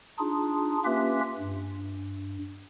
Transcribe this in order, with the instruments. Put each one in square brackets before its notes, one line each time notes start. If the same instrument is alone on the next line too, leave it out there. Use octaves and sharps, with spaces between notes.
[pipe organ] D4 D#4 F4 G#4
A#3 C#4 F4 G4 B4 E5
G2